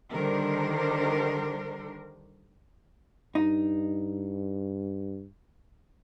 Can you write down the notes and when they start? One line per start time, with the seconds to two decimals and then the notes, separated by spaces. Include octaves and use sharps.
0.14 D3 D#3 G3 D4 A#4 C5
3.35 G2 D#4